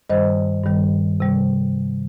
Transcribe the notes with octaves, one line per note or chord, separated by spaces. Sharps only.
G2 D#3 G3 C5 D#5
G2 D#3 G3
C3 G3